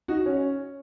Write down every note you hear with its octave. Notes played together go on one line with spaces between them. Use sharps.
D#4 F#4
C#4